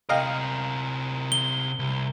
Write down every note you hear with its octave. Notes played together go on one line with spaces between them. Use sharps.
C3 A#4 D#5 F5 G5
G7
C2